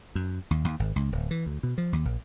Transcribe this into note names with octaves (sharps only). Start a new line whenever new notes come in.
F#2
D#2
D#2
G#1
C#2
D1
E3
D2
B2
F3
D#2
A#1